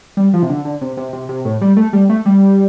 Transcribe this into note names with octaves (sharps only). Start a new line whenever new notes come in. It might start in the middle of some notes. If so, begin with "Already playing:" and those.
G3
F3
C3
D3
D3
C3
C3
C3
C3
A2
G3
A3
G3
A3
G3